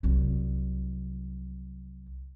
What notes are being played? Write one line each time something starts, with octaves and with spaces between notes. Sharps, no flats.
C2 F#3